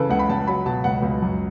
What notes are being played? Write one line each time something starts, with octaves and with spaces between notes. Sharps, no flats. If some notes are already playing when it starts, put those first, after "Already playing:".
Already playing: C#3 E3 A4 B4
C#2 F#5
B5
C#2 A5
F#3 B5
B2 A5
C#2 F#5
C#2
F#2